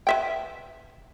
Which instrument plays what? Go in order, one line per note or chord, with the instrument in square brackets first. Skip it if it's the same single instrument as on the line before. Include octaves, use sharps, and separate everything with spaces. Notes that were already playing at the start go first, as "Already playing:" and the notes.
[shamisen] B4 E5 G5